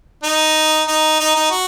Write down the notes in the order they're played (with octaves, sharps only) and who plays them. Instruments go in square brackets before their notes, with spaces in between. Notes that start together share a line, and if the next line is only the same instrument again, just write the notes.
[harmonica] D#4
D#4
D#4
D#4
F#4